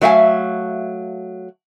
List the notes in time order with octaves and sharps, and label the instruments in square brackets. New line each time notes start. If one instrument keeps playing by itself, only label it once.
[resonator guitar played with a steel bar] F#3 A3 E5 F5 G#5